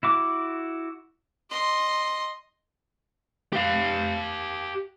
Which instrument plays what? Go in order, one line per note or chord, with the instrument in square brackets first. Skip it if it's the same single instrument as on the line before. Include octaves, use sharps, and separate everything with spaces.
[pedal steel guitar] E4 F#4 D6
[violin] D#5 C6
[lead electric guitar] G4 F5